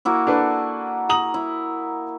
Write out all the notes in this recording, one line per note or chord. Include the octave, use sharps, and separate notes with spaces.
A#3 E4 F#4
D4 A4 B4
A#5 D#6 F#7
E4